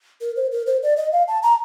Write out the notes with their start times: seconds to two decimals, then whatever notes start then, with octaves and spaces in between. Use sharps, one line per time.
0.21 A#4
0.36 C5
0.52 A#4
0.66 C5
0.83 D5
0.97 D#5
1.12 F5
1.28 A5
1.43 A#5